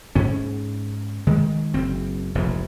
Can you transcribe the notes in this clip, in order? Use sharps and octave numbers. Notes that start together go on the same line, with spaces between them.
G#2 C#4
D#3 G#3
F#1 C4
F1 A#1 G#2